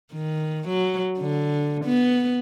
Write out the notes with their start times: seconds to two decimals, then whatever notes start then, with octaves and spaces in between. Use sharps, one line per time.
0.12 D#3
0.68 F#3
1.19 D3
1.85 B3